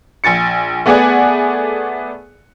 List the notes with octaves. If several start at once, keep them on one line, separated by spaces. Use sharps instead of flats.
A#1 G#5 A6 C#7
A3 B3 G#4 D5 F#5 G#5